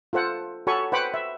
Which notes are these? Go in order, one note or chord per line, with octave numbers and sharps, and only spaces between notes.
F4 A4 C5 F#5
F#4 A4 C#5 G#5 B5 C#6
B4 C5 F#5 G5 B5 D6
E5